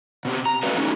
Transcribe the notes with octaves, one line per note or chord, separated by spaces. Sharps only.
B2 C4 G4
A#5
A3 C#4 F#4 B4 D#5 F5
A3 C#4 D#4 F#4 G4